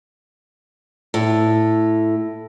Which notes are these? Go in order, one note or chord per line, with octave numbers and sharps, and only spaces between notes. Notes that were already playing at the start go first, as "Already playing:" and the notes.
A2